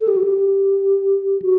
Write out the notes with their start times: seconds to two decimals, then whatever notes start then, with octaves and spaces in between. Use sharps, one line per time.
0.01 A4
0.08 G4
0.16 F#4
0.24 G4
1.42 F#4